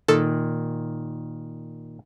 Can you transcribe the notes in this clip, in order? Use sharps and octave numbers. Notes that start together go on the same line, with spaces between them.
A#2 D#3 A4